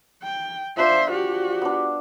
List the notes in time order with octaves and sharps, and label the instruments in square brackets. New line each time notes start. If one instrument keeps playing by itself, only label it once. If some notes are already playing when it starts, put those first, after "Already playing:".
[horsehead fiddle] G5
[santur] F3 D4 F5 [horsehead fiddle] C5 E5
[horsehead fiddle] F#4 G4
[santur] B3 D4